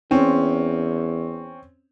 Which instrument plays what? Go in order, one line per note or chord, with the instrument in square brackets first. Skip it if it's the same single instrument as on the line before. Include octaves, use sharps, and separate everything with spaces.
[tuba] E2 [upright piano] C4 C#4